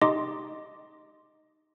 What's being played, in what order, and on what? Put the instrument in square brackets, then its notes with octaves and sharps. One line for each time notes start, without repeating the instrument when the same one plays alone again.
[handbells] D#4 G4 D#5 C6 D6